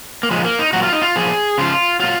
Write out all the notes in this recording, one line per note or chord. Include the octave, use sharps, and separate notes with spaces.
A#3
A#2 F3 G#3
A#3
D#4
A#2 F#3 F#4
F4
D#4
F4
A#2 F3 G#4
C#3 F3 F4
A#2 F#3 F4